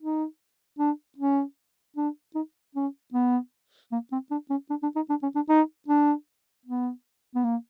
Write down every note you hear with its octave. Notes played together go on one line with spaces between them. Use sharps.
D#4
D4
C#4
D4
D#4
C#4
B3
A#3
C4
D4
C#4
D4
D4
D#4
D4
C#4
D4
D#4
D4
B3
B3
A#3